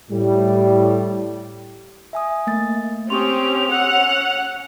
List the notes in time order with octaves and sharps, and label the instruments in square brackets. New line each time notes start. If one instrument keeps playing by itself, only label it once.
[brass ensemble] A2 G3
[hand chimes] E5 G#5 D#6
A3 A#3 A6
[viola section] C4 C#4 G4 [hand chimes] C6 C#6 D#6 [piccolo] F7
[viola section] C#4 F#5 [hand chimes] E6 F#6